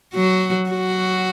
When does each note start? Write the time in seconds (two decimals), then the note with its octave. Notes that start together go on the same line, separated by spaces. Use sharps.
0.15 F#3 F#4
0.70 F#3 F#4